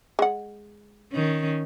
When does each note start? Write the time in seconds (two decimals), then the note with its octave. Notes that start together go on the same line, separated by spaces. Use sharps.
0.19 G#3 F#5
1.12 D#3 C#4